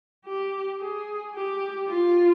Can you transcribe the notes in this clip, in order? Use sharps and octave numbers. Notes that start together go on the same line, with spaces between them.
G4
G#4
G4
F4